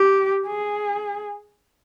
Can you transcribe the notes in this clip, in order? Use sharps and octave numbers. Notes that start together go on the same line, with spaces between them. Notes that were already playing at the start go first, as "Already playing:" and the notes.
Already playing: G4
G#4